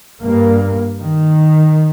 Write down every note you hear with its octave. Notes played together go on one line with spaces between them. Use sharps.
G2 A#3
D#3